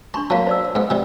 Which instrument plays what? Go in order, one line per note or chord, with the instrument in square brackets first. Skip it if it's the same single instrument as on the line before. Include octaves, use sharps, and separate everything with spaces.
[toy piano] D4 C6 C#6 [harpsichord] A5
[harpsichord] F#3 A#3 [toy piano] F#4 F5 A5
[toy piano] C5 D5 E6
[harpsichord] G#2 B3
C3 G3